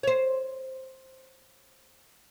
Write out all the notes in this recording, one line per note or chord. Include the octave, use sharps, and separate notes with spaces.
C5 C#5